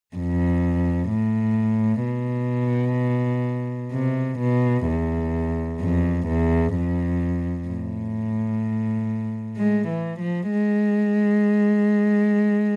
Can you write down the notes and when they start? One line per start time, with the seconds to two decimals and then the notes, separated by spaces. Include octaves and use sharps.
0.16 F2
1.10 A2
2.04 B2
3.92 C3
4.39 B2
4.87 E2
5.80 F2
6.28 E2
6.75 F2
7.68 A2
9.57 G#3
9.88 E3
10.20 F3
10.51 G#3